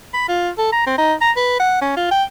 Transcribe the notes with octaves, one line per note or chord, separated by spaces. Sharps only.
B5
F4
A4
A#5
C4
D#4
A#5
B4
F#5
C#4
F4
G5